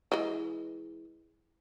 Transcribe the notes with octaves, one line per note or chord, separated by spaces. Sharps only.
E3 G#3